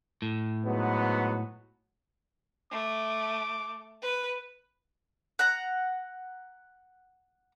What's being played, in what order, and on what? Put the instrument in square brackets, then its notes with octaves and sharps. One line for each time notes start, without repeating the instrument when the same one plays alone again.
[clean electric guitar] A2
[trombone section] G#2 F#3 B3
[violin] A3 [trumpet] D6
[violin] B4
[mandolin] F#5 A#5